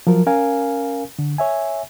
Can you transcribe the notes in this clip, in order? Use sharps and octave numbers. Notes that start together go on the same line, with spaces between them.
F3 F#3 A#4
C#4 A#4 F5 G#5
D3
C#5 E5 G#5